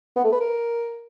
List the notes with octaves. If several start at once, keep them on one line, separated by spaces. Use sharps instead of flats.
B3
A3
B4
A#4